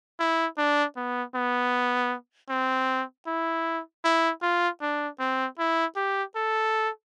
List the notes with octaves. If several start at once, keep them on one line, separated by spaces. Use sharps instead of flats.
E4
D4
B3
B3
C4
E4
E4
F4
D4
C4
E4
G4
A4